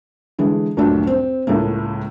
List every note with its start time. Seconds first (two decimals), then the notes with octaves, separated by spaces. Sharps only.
0.39 D3 E3 G#3
0.77 D2 G2 A#2 F#3 A3 D4
1.07 C4
1.47 C#2 A2 C#3 A3 A#3